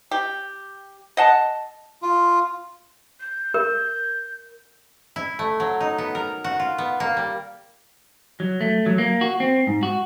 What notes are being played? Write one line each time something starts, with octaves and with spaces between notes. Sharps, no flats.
G4
D#5 F#5 A5
F4
G6
A#4
E4
A3
F#3
D#4
B3
A#4
F#4
F4
B3
A#3
G3
F#3
A3
F#3
A#3
F#4
C4
G#2
F#4